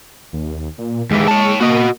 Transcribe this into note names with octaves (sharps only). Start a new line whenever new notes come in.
D#2
A#2
D#2 E3 G#3
C#5 A5
A#3 F#4 D#5